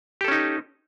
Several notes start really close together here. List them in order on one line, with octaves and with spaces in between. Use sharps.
G4 A4 C#4 D#4